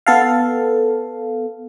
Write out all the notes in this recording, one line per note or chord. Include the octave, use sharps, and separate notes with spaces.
B3 A4 F5